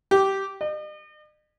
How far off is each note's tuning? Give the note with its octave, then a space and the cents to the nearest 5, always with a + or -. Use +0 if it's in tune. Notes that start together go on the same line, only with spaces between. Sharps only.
G4 -15
D#5 -45